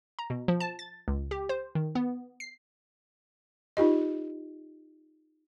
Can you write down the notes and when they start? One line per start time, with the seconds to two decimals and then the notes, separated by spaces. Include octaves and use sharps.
0.19 A#5
0.30 B2
0.48 F3
0.60 A5
0.79 A6
1.08 C#2
1.31 G4
1.49 C5
1.75 D#3
1.95 B3
2.40 C7
3.77 D#4 F4 G4 D#5